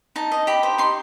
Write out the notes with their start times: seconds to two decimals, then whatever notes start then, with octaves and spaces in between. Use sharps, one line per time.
0.16 D#4 A5
0.32 D#5
0.47 G4 B5
0.63 C5
0.78 D#4 C6